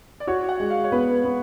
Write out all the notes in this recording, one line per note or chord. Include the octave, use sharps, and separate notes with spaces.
D5
F#4 C#5
F#5
G#3
F5
C#5
B3 B4
B3